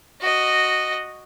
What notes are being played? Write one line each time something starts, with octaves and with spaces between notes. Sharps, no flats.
F#4 D#5